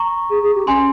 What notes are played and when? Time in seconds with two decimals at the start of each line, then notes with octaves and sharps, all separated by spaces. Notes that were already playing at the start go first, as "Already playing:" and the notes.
Already playing: A#5 C#6
0.30 G#4
0.43 G#4
0.55 G4
0.67 C#4 G#5 C6